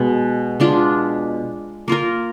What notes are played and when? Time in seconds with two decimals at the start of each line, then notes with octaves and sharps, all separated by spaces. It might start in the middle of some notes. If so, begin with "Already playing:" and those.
Already playing: B2 G#3
0.60 G#3 D4 F4
1.88 A#3 F4 A#4